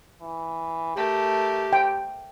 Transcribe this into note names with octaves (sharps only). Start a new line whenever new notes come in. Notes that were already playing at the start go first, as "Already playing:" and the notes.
E3
A3 G4 A#4
G5